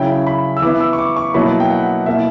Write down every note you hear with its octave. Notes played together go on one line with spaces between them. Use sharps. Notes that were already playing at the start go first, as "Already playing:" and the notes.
Already playing: C#3 F#3 C#4 E4 G5
B5
E6
E3 B3 E4 D6
E6
C#6
D6
C#6
B2 F#3 A#3 E4 B5
G5
F#5
B2 A#3 E4 E5